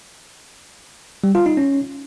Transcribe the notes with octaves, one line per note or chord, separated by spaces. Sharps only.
G3
F4
D#4
C#4